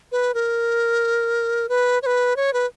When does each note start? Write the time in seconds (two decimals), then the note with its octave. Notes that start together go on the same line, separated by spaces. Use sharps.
0.12 B4
0.34 A#4
1.69 B4
2.03 C#5
2.06 B4
2.36 C#5
2.53 B4